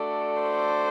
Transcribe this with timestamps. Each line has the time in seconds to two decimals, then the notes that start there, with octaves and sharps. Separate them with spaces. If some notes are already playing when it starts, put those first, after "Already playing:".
Already playing: A3 D4 F#4 A4 D5
0.41 C5